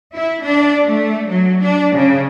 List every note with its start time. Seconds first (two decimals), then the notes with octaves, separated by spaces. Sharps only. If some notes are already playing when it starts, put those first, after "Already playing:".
0.15 E4
0.44 D4
0.86 A3
1.28 F#3
1.62 D4
1.95 C#3